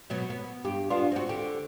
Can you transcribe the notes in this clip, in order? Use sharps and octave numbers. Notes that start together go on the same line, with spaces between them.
B2 F#3 B3
B3
G2 G4
B3 D4 F4
C4 F#4
D3 G4